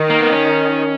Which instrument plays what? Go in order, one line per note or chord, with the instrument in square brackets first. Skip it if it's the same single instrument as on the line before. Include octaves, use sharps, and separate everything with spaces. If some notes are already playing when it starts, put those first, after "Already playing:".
Already playing: [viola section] D#3
[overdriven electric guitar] A#3
B3
C#4